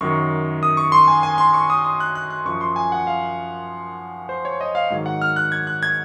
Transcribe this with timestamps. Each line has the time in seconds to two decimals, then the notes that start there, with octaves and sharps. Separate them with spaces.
0.01 F#2 D#3 F#3 C#6
0.63 D#6
0.77 C#6
0.92 C6
1.08 G#5
1.23 G#5
1.38 C6
1.54 C#6
1.70 D#6
1.85 D#6
2.00 F#6
2.15 F#6
2.30 F#6
2.45 F#2 F3 C#6
2.61 C6
2.76 G#5
2.92 F#5
3.07 F5
4.29 C5
4.45 C#5
4.61 D#5
4.75 F5
4.90 G#2 D#3 F#3
5.06 F#5
5.22 F6
5.36 F#6
5.52 G#6
5.67 F#6
5.83 G#6